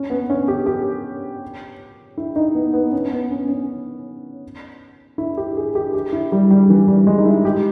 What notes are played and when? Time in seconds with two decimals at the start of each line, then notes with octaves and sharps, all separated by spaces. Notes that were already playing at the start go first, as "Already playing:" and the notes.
Already playing: C#4
0.10 B3
0.30 C#4
0.48 G4
0.66 G4
2.17 E4
2.36 D#4
2.55 B3
2.73 B3
2.92 C#4
3.11 B3
3.31 C#4
3.49 C#4
5.18 E4
5.37 G4
5.57 G#4
5.75 G4
5.94 G4
6.13 E4
6.32 G3
6.51 G3
6.70 E3
6.88 G3
7.07 G#3
7.18 D#4
7.25 E4
7.45 G4